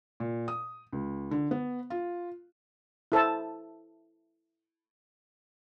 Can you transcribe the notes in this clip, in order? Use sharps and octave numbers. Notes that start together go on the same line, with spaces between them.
A#2
D#6
C#2
D3
B3
F4
E4 A4 C5 A5